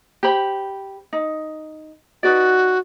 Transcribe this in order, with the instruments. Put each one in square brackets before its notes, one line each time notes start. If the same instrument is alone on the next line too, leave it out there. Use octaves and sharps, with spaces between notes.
[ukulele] G4 C5 B5
D#4
[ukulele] D#4 B4 D5 [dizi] F#4